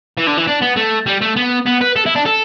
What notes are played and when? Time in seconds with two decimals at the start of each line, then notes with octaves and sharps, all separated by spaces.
0.18 E3
0.27 D3
0.37 E3
0.47 D4
0.62 B3
0.76 A3
1.06 G3
1.21 A3
1.36 B3
1.66 B3
1.81 B4
1.96 A4
2.06 E4
2.16 D4
2.26 A4